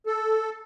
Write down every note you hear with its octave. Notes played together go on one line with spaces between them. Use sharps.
A4